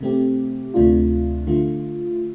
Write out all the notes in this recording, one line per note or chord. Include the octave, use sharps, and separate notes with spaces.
C3 A3 C4 G4
D2 C3 A3 D4 F4
D3 A3 F4